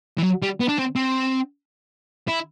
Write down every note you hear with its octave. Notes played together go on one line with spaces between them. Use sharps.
E3
F#3
G3
B3
D4
C4
C4
E4